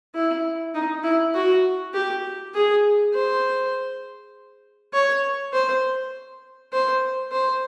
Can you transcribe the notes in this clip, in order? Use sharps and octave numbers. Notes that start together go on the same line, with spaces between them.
E4
D#4
E4
F#4
G4
G#4
C5
C#5
C5
C5
C5